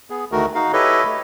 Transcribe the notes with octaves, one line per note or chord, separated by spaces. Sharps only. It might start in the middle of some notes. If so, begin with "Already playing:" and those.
B3 G#4
D2 D#3 A3 F#4 A#4
D#4 F#4 F5
E4 G4 A4 B4 C#5 D#5
A3